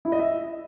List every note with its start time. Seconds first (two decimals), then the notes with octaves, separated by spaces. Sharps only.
0.05 E4
0.12 D#5
0.19 E5